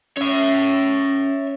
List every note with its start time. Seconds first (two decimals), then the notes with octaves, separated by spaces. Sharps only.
0.17 C#4 C#5 E5